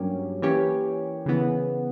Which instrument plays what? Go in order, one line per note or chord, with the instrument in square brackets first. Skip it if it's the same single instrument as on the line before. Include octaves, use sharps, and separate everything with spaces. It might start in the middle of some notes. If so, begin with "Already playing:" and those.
Already playing: [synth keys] G2 F#3 A#3 C#4 G4
E3 A#3 C#4 G4 C#5
C#3 E3 B3